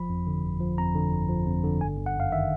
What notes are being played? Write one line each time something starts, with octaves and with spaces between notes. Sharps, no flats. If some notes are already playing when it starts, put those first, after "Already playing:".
Already playing: G1 F3 B5
F2
D3
G1
F3
F2 A#5
D3
G1
F3
F2
D3
G1 G#5
G1
F#5
F#2
F5
D#3 E5